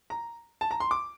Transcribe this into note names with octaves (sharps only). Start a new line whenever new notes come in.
A#5
A5
A#5
C6
D6